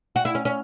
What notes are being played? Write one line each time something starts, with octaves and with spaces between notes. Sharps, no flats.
F#4
E4
C#4
C#4